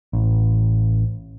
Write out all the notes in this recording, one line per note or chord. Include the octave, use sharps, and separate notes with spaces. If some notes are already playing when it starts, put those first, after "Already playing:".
A1